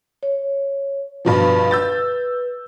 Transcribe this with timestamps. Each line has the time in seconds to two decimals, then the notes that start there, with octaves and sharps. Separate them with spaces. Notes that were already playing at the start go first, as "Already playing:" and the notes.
0.23 C#5
1.25 G2 B2 F3 B4
1.71 E6 G6 A6